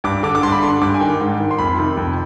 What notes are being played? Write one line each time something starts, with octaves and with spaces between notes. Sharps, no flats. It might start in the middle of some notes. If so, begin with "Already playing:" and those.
G2 D6
D3 D6
D6
G2 C6
B5
D3 C6
G2 D6
G#5
D#3 G5
G#2
D#3
C6
F2 B5
C3 D#3
F2